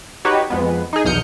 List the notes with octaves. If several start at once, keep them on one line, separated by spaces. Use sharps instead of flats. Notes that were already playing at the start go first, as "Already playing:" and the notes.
D#4 F#4 G4 B4 C#5
F2 G#3 B3
D#4 G#4
B1 E2 D#6 F6 G6 C#7